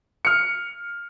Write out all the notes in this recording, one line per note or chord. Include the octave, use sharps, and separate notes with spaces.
F6 C#7